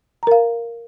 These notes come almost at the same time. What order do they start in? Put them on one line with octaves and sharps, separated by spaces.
A#5 A#4 F5